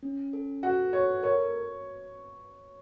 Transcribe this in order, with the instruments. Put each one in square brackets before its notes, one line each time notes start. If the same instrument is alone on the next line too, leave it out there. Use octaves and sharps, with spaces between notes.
[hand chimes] C#4
A4
[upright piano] F#4 [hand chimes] A4
[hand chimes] A4 [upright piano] C#5
[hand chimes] A#4 [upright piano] C#5